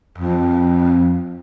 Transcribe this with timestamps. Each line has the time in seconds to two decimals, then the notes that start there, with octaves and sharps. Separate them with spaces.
0.18 F2